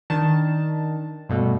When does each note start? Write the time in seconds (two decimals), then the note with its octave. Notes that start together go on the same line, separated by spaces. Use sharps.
0.10 D#3 D4 A5
1.29 G2 B2 A3